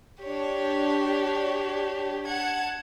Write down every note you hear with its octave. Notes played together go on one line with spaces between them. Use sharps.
D4 G4 C#5
F#5 A5 G#6